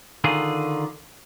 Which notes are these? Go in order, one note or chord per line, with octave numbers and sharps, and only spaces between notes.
D3 D#3 F4 G#4